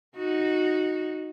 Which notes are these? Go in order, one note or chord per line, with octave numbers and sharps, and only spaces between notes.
D#4 F#4